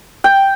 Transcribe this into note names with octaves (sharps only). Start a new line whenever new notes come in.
G5